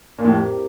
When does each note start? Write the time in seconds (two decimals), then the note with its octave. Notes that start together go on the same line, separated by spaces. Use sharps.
0.18 A#2
0.24 F2 A2 G3 C4 E4 G4 A#4